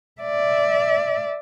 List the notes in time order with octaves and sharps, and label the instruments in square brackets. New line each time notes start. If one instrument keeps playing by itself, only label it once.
[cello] D5 E5